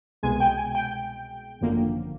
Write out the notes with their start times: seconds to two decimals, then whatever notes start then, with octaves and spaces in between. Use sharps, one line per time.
0.23 C2 B2 G#3 G#5
0.40 G5
0.57 G#5
0.75 G5
1.61 G#1 F#2 D3 F3 A#3